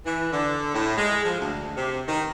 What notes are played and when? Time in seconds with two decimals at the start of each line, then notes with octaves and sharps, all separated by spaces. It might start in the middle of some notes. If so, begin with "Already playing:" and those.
0.05 E3
0.32 D3
0.74 A2
0.97 G#3
1.24 F3
1.39 D2
1.76 C3
2.08 D#3